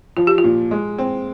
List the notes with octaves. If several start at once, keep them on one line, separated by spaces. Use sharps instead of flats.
F3 F4
G4
F4
A#2
G#3
C4